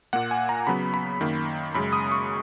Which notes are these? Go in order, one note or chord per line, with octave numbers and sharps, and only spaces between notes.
A#2 A#3 F#5
G#5
A#5
C#3 F#3 B3 B5
B5
F#2 D#3 A#3
F#2 C#3 G#3 B5
D#6
C#6